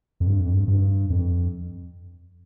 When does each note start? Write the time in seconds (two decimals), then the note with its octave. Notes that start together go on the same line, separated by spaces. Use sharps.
0.20 F2
0.26 G2
0.40 F2
0.53 G2
0.68 G2
1.10 F2